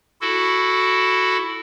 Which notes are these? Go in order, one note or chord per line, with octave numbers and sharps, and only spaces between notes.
E4 F#4 A4